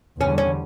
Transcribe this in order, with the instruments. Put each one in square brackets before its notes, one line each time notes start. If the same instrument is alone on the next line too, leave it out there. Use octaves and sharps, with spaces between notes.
[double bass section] E2 D3 G3 [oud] C#4
[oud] C#4